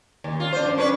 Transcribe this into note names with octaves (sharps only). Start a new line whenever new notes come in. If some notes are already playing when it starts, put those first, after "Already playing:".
D#2
F4
D4 C5
F#2
C#4 D4 B4